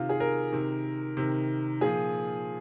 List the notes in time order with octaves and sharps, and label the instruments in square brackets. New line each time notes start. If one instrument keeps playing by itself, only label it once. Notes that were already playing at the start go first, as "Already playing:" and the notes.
Already playing: [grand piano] C3 D#3 F4
G#4
A#4
C3 D#3
C3 D#3
A#2 F3 G#4